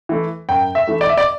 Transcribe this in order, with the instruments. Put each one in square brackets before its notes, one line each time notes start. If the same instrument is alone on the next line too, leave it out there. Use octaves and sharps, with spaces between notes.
[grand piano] E3 A3
F#2 G5
E5
E3 A3
D5
E5
D5